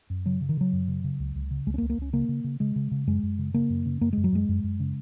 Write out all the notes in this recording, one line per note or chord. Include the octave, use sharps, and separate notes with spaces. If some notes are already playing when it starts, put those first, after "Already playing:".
F#2
C#3 F#3
C#3
D#3
C#3 F#3
F#2
C#3
C#3
C#2
C#2
C#3
C#2 G#3
C#4
A#3
C#2
A#3
C#2 C#4
C#3 A#3
C#3
C#3
C#3 G#3
C#3
C#3
F#2 G#3
F#2
C#3
C#3 A#3
F#2
C#3
F#2 A#3
F#2 G#3
F#3
F#2 G#3
F#2
F#2
C#3